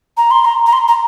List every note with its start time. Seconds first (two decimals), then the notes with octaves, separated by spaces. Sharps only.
0.17 A#5
0.31 C6
0.44 A#5
0.66 A#5
0.72 C6
0.88 A#5